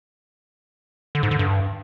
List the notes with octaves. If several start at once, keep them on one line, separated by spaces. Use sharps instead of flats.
D3
G#2
D3
G2